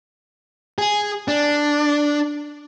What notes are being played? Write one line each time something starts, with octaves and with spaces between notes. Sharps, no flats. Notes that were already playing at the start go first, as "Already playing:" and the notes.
G#4
D4